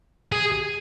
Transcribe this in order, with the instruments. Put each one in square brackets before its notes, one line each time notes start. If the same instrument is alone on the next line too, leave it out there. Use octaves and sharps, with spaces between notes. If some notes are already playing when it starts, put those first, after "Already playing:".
[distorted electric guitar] G#4